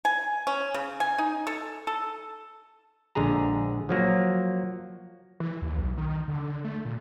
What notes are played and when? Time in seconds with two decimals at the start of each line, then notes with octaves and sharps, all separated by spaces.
0.05 G#5
0.47 C#4
0.74 C#3
1.00 G#5
1.18 D#4
1.47 A4
1.87 A4
3.15 A#1 D3 G#3 G#4 A#5
3.89 F3 F#3 A#3
5.40 E3
5.62 D#2
5.78 B1
5.98 D#3
6.28 D3
6.64 A3
6.85 A#2